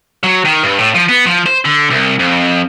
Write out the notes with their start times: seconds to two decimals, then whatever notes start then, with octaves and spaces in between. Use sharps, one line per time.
0.24 F#3
0.45 D#3
0.63 G2
0.79 A2
0.95 F3
1.09 B3
1.26 F3
1.46 C5
1.65 D3
1.90 C2
2.19 F2